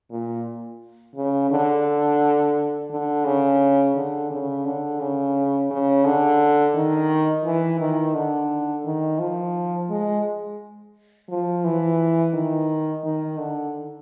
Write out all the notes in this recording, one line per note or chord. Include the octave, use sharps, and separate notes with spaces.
A#2
C#3
D3
D3
C#3
D3
C#3
D3
C#3
C#3
D3
D#3
E3
D#3
D3
D#3
F3
G#3
F3
E3
D#3
D#3
D3